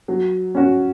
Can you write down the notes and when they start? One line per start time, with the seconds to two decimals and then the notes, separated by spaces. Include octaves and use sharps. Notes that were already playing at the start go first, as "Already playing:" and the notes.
0.08 F#3
0.55 C#4 F#4